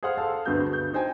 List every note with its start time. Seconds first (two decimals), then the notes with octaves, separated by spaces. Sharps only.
0.03 G#4 C5 F5 F#5 C6 F6
0.18 A4 F5 A5 E6
0.45 D2 G2 B3 F#4 G#4 G6
0.73 G6
0.93 D#4 C5 G5 G#5